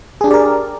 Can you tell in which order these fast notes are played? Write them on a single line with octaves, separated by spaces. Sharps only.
G#4 D4 G4 D5 A#4